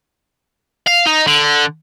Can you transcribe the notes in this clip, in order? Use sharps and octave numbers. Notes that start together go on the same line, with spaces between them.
F5
D#4
D3